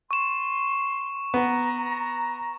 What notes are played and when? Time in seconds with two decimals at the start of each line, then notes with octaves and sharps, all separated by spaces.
0.11 C6 C#6 E7
1.34 B3 A#5